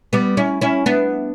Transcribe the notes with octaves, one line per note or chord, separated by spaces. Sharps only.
G3 B3
C#4 E4
C#4 E4
B3 D4